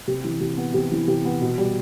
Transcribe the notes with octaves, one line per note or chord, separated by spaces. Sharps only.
C3
E3
C3
B3
C3
E3
C3
B3
B2
G3